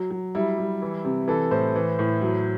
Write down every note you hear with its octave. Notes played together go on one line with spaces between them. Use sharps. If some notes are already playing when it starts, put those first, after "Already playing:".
Already playing: F#3
F#3
G3 E4
G3
E3
C3
E3 A4
A2 C5
E3
A2
F#3